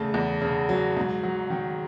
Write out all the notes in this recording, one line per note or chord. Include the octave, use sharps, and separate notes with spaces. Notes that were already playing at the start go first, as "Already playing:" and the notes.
Already playing: E2 C#3 A3 A5
E2
C#3
F#3
G#2
F#3
D#3